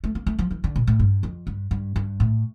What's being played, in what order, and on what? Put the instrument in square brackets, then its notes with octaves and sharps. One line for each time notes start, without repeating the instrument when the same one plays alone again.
[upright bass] A3
A#3
A3
F3
E3
D3
A#2
A2
G2
F2
G2
G2
G2
A2